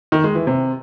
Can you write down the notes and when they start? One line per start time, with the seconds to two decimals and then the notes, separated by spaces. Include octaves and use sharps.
0.12 D#3
0.24 G#3
0.35 E3
0.47 C3